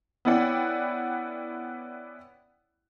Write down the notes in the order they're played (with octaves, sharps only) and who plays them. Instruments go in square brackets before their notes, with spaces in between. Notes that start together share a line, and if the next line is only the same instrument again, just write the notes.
[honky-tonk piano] B3 C#4 E4 D5 F#5 G5